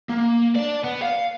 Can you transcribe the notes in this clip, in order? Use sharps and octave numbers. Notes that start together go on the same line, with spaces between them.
A#3
D5 A5
B3
F5